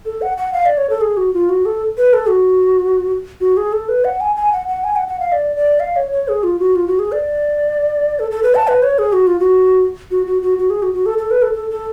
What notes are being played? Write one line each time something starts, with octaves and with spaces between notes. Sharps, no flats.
A4
F#5
F#5
F5
D5
C#5
A4
G#4
F#4
F4
F#4
A4
B4
A4
F#4
F#4
G#4
A4
B4
F#5
G#5
G#5
F#5
F#5
G#5
F#5
F#5
F5
D5
D5
F5
C#5
C#5
G#4
F4
F#4
F4
F#4
G#4
D5
A4
A4
B4
A5
B4
C#5
G#4
F#4
F4
F#4
F#4
F#4
F#4
F#4
G#4
F#4
F#4
A4
A4
B4
A4
A4
A4